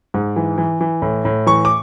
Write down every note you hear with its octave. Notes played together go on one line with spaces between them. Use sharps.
G#2
E3
E3
E3
A2
A2
E3 C#6
D6